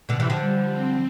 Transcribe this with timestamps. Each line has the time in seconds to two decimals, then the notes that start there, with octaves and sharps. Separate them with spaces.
0.09 B2 D3
0.20 C3 E3
0.30 D3 F3
0.41 G3
0.72 C4